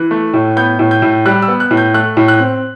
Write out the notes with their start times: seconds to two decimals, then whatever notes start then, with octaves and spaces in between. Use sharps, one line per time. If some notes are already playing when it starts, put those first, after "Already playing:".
Already playing: E3 F#6
0.11 A3
0.34 A2
0.57 B3 G6
0.79 A2
0.91 G6
1.02 A2
1.26 G3 F#6
1.42 E6
1.48 B3
1.60 F#6
1.71 A2
1.77 G6
1.94 A3 F#6
2.17 A2
2.28 F#6
2.40 C4